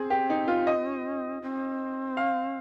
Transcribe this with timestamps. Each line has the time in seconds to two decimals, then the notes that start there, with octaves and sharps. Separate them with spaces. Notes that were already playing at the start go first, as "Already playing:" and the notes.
Already playing: C4 G#4
0.10 G4
0.30 D#4
0.48 F4
0.67 D#5
1.42 C4
2.17 F5